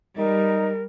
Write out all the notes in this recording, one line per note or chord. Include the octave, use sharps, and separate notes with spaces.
G3 D#4 A#4